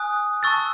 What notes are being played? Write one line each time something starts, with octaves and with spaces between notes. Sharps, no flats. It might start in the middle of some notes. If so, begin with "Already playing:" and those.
Already playing: G#5 D#6 F#6
A5 C#6 E6 A6